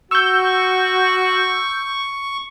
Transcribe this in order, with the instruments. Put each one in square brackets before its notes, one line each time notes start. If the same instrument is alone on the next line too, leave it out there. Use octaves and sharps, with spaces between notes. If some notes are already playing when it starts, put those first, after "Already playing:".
[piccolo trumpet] F#4 [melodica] C#6 [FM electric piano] E6 G6